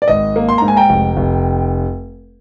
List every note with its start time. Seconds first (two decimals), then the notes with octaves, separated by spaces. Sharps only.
0.02 D5
0.08 G#1 D#5
0.36 A#3
0.49 C6
0.58 G#2 A#5
0.68 G#5
0.77 G5 A#5
0.90 F1
1.17 F1